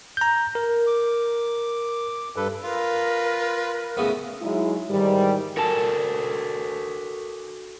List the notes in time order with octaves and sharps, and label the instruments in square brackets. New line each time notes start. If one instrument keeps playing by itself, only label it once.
[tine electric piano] A#5 G6
A#4
[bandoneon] D6
G2 A4 B4
[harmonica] F4 B4 [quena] A#4
[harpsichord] A2 C#3 B3
[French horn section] F#3 G#3 D#4 E4
G#2 D#3 E3 G3
[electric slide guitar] F#4 A4 G#5 [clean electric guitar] A#4 A5